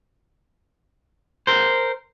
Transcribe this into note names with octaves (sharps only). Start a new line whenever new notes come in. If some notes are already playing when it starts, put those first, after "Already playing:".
A#4 C5